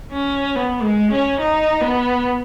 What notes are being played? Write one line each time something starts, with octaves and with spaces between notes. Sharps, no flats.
C#4
B3
G#3
C#4
D#4
B3